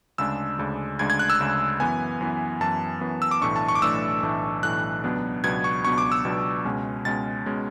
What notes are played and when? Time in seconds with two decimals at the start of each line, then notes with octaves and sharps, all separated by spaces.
0.18 D2 C#3 G#3 D4 E6
0.58 D2 C#3 G#3 D4
0.99 D2 C#3 G#3 D4 G#6
1.10 G#6
1.19 F#6
1.30 E6
1.40 D2 C#3 G#3 D4
1.80 F#2 E3 B3 G#5
2.21 F#2 E3 B3
2.61 F#2 E3 B3 A5
3.01 F#2 E3 B3
3.22 E6
3.31 D6
3.41 B1 A2 E3 A3 D4 C#6
3.56 A5
3.68 C#6
3.75 D6
3.82 B1 A2 E3 A3 D4 E6
4.23 B1 A2 E3 A3 D4
4.63 B1 A2 E3 A3 D4 F#6
5.04 C#2 B2 F#3 B3 D4
5.44 C#2 B2 F#3 B3 D4 G#6
5.64 C#6
5.84 C#2 B2 F#3 B3 D4 C#6
5.98 D6
6.12 E6
6.25 C#2 B2 F#3 B3 D4
6.65 C#2 B2 G#3 C#4
7.05 C#2 B2 G#3 C#4 A6
7.46 B2 G#3 C#4